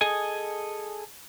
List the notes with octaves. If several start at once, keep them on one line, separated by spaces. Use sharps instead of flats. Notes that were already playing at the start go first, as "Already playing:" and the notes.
G#4 A4 D#5 G#5